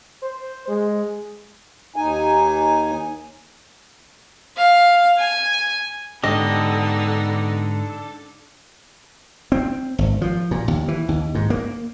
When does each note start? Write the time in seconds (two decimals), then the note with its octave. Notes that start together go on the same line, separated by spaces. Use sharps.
0.23 C5
0.68 G#3
1.96 D#2 D#4 G#5
4.57 F5
5.18 G#5
6.24 G#2 D3 B3 D4 D#4 G4 A4 D#5
9.52 C4
9.98 G#1
10.21 F3
10.51 A#2
10.68 D#2
10.88 E3
11.09 D#2
11.35 G#2
11.50 A#3